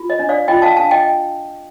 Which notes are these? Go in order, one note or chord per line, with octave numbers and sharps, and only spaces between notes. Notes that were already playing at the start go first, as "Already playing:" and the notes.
Already playing: F4
D#5
D4
D5 F5
F4 D#5 G5
F5 A5
D4 F5 A5
D#5 G5